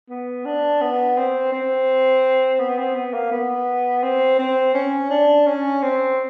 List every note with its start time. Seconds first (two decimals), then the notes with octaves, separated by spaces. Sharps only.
0.10 B3
0.46 D4
0.81 B3
1.18 C4
1.52 C4
2.60 B3
2.78 C4
2.96 B3
3.14 A#3
3.32 B3
4.03 C4
4.39 C4
4.74 C#4
5.10 D4
5.46 C#4
5.82 C4